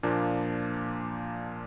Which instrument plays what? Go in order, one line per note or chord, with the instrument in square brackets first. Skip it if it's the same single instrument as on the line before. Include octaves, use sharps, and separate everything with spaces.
[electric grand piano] A#2 F3 A#3 D4